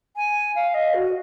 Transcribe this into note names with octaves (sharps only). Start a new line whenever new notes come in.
G#5
F5
D#5
F#4